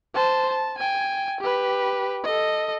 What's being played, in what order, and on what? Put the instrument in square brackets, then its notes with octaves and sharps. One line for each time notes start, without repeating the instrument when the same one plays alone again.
[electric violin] C5 A5
A5
G5 G#5
G4 B4
A4 D#5